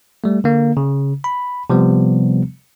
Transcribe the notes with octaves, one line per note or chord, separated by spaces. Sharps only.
G3 A3
D3 A#3
C#3
B5
C3 F3 G3 B3